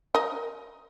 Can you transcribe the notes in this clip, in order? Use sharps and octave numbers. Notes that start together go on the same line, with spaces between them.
A#4 D#5